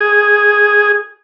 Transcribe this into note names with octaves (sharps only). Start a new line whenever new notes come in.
G#4